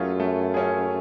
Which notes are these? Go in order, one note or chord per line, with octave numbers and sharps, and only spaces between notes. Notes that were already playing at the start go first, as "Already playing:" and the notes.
Already playing: F#2 A3 C#4 F4 G#4
A3
C#4 F4 G#4